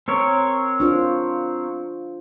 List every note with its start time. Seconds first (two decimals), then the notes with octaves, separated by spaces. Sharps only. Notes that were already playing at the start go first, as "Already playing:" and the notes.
0.08 C4 A#4 C#5
0.80 D4 F4 C5